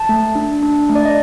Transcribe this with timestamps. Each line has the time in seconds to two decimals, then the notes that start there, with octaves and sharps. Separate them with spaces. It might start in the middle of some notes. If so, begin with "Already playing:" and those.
Already playing: A5
0.09 A3
0.35 D4
0.63 D4
0.89 A3
0.95 D5
1.06 D#5